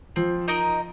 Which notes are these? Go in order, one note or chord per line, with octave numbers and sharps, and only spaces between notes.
F3 C4
D#4 A#4 D#5